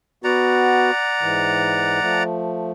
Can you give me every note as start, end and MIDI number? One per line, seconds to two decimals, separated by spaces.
0.24 0.91 59
0.24 0.91 66
0.24 2.23 74
0.24 2.23 78
0.24 2.23 82
1.21 2.00 44
1.21 2.00 52
2.02 2.72 53
2.02 2.72 57